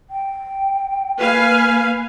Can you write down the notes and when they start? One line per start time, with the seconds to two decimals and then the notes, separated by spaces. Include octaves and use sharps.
0.10 G5
1.20 A#3 B4 F5 G#5